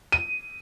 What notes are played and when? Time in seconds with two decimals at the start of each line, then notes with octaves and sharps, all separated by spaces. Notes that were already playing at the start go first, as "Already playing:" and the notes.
0.12 D#7